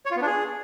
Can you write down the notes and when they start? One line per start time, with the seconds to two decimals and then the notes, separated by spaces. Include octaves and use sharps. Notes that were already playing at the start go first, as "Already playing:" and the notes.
0.06 C#5
0.11 F4
0.16 B3
0.21 D4
0.27 G#4